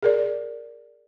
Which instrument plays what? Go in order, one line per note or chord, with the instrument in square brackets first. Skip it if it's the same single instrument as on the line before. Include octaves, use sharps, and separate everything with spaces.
[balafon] G#4 A#4 D5